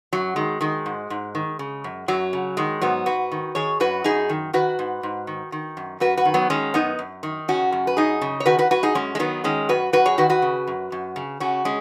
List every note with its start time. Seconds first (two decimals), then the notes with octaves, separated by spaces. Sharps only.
0.12 F#2 F#3
0.36 D#3 G#3
0.61 D#3 G#3
0.86 G#2
1.10 G#2
1.35 D#3
1.59 C#3
1.84 F#2
2.08 F#2 F#3
2.33 C#3
2.57 D#3 G#3
2.82 G#2 F#3 B3
3.06 G#2 F#4 B4
3.32 D#3
3.55 D#3 G#4 C#5
3.80 F#2 F#4 B4
4.04 F#2 D#4 G#4
4.29 D#3
4.53 D#3 F#4 B4
4.79 G#2
5.03 G#2
5.27 D#3
5.52 D#3
5.77 F#2
6.00 F#2 F#4 B4
6.17 F#4 B4
6.25 D#3
6.34 F#3 B3
6.50 D#3 G#3 C#4
6.74 F#2 B3 D#4
6.99 F#2
7.23 D#3
7.48 C#3 C#4 F#4
7.72 F#2
7.87 B4
7.97 F#2 D#4 G#4
8.21 C#3
8.40 C#5
8.46 D#3 F#4 B4
8.59 F#4 B4
8.71 F#2 F#4 B4
8.83 D#4 G#4
8.95 F#2 G#3 C#4
9.15 G#3
9.19 D#3 F#3 B3
9.44 D#3 G#3 C#4
9.69 F#2 F#4 B4
9.93 F#2 F#4 B4
10.06 G#4 C#5
10.18 D#3 F#4 B4
10.30 F#4 B4
10.42 C#3
10.67 F#2
10.92 F#2
11.16 C#3
11.40 C#3 C#4 F#4
11.65 G#3 C#4